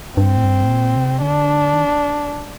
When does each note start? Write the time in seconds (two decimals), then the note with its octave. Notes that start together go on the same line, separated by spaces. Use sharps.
0.17 G2 C4
0.37 A2
0.44 G2
0.64 A2
0.69 A#2
0.96 C3
1.21 D3 D4
1.73 D#3